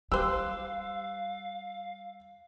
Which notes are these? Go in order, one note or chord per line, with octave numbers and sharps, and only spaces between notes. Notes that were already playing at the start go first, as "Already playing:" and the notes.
G3 G4 C5 F5 E6 F#6